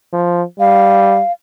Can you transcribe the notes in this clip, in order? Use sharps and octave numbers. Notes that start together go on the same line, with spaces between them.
F3
G3 F5